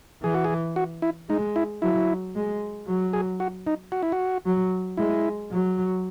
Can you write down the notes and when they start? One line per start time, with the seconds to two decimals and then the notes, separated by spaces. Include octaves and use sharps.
0.23 E3 G#4
0.35 F#4
0.44 G#4
0.76 F#4
1.02 E4
1.29 G#3 D#4
1.56 E4
1.82 F#3 E4
2.35 G#3
2.87 F#3
3.13 G#4
3.40 F#4
3.67 D#4
3.92 F#4
4.03 E4
4.12 F#4
4.45 F#3
4.97 G#3 E4
5.51 F#3